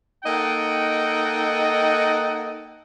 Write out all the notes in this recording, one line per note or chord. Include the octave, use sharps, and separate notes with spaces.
A#3 D#4 A4 D#5 F#5 G5